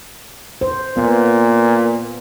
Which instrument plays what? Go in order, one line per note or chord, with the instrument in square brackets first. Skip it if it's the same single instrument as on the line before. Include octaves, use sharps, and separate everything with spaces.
[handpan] C5
[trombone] A#2 [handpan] B3